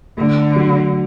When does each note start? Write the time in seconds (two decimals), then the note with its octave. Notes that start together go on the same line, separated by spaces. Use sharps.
0.17 D3 A3
0.56 F#3